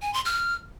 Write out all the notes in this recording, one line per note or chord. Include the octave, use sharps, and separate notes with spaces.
G#5
C6
F6